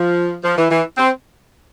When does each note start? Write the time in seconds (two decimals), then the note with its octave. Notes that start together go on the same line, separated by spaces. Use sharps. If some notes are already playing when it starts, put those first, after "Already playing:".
Already playing: F3
0.44 F3
0.58 E3
0.71 E3
0.98 C4